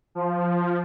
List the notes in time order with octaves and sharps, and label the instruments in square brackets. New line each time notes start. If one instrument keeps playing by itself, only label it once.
[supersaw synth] F3